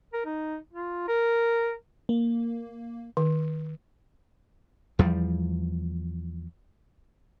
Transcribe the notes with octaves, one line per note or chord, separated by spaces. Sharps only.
A#4
D#4
F4
A#4
A#3
D#3
E2 F3 G3